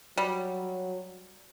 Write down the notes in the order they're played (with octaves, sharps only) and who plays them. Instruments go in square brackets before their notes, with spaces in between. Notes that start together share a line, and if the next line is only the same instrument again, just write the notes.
[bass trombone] F#3 [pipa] G3